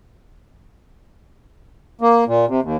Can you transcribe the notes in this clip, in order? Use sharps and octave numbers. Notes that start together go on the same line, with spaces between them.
A#3
A#2
C3
D#2